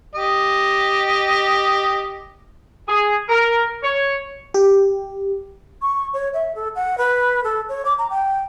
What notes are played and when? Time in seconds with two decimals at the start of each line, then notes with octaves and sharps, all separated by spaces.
0.15 G4 D#5
2.89 G#4
3.29 A#4
3.84 C#5
4.54 G4
5.82 C#6
6.14 C#5
6.34 E5
6.55 A4
6.76 F#5
6.98 B4
7.44 A4
7.69 C#5
7.85 D6
7.99 A#5
8.10 G5